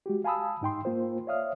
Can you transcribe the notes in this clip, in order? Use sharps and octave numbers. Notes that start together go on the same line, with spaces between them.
G#3 F#4 G4
F5 G#5 A5 B5 D#6 E6
G#2 D#4 G5 C6
A#3 F4 C5
C#5 D5 E5 F5 D#6 F6